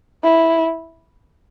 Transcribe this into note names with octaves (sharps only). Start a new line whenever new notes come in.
E4